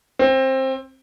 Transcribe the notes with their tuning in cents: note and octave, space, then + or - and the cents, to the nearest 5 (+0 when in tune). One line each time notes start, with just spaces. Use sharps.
C4 +20